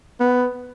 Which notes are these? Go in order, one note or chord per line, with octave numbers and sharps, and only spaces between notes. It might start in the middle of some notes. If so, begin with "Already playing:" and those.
B3